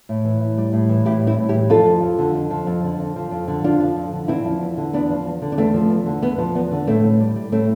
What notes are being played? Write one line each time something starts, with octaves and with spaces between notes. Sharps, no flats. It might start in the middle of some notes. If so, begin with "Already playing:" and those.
A2
E3
A2
G3
A2
E3
A2 E4 G4
G3
C4 E4
A2
E4 G4
E3
F2 F4 A4
F3
F2
D3
F2
F3
F2
D3
F2
F3
F2
D3
F2 D4 F4
F3
F2
D3
E2 C4 E4
F3
E2
D3
E2 B3 D4
F3
E2
D3
D4
E2 A3 C4
F3
E2
D3
E2 B3
F3
E2 B3
D3
A2 A3 C4
A2
G3
G3
A2 A3 C4